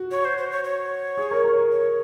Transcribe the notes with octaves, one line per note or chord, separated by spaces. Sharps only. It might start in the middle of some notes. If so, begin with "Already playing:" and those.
Already playing: F#4
C#5
C5
C5
C#5
C#5
G#4
A#4
A#4
C#5